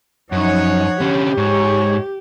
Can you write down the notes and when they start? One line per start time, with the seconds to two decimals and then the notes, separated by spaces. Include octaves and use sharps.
0.32 F#2 F3 D#4 C#5 F#5
1.01 D3 C#4 G4
1.37 G#2 C#5